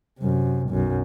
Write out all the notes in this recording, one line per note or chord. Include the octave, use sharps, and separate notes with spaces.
F#2 C3
B1 F#2